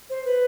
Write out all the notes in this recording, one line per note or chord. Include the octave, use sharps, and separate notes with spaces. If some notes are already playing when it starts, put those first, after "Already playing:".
C5
B4